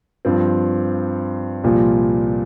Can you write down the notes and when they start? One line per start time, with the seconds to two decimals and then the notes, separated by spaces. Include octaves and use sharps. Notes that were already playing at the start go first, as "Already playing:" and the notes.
0.25 G2 F3 C4
1.64 C2 A#2 F3